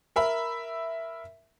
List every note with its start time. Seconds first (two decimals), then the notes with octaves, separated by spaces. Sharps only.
0.16 A#4 E5 B5